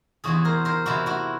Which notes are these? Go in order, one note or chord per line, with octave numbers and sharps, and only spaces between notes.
E2 C3 E3 F#4 G#4
A#4 C5
A#4 C5
E2 C3 E3 E4 F#4
E4 F#4